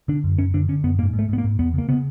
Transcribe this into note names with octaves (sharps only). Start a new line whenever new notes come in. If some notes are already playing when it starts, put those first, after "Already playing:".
D3 D4
F#2
F#2 C#4
D3 D4
D3 C#4
F#2 B3
G#2 A#3
G#2
A3
G#2 B3
A#3
G#2
E2 B3
C#3 A#3
C#3 B3